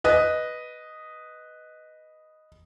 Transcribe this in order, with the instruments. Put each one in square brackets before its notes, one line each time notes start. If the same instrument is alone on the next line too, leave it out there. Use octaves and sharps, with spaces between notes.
[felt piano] B4 D#5